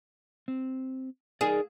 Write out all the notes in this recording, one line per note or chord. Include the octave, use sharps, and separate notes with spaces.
C4
D#4 G#4 A#4 D5